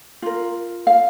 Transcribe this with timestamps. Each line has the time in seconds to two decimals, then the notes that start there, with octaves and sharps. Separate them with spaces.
0.22 F4 A#4
0.87 F5